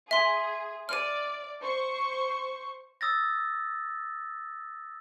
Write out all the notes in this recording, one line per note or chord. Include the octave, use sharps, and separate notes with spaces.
G#4 E5 C6
D5 F6 D#7
C5 C#6
D#6 E6 A6 A#6